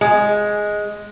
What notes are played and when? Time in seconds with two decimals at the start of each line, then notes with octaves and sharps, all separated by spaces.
0.01 G#3